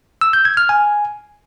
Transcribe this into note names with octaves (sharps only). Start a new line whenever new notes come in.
E6
G6
G#6
F6
G#5